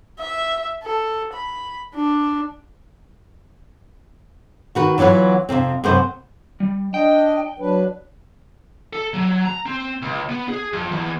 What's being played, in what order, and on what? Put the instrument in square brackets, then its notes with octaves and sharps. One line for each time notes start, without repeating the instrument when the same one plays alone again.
[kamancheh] E5
A4
B5
D4
[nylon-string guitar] D#3 F#4 B4
E3 F#3 B3 F4 B4
F2 A2 C3 C4
F#2 C3 B3 B4 C5
[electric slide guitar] G3
[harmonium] D4 D#5 [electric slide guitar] G5
[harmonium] F#3 D4 B4
[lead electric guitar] A4
F#3
A#5
C4
C#2
B3
G#4
F2
E2